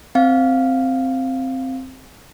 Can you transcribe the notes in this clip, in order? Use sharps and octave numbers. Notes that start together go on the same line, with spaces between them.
C4 F5